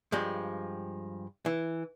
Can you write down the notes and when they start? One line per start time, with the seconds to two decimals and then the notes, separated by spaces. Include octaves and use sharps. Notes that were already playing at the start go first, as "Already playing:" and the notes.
0.12 G2 F3 G#3
1.46 E3